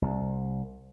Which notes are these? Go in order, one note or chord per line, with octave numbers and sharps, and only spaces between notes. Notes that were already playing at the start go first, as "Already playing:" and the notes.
C2